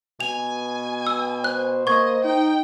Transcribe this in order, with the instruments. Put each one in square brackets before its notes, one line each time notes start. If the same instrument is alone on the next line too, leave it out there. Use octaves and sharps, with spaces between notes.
[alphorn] B2 [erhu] G#5 [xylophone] F7
[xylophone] E6
[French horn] C5 [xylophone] F#6
[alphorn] A#3 [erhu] D#5 [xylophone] C#6 G#6
[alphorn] D#4 [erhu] G5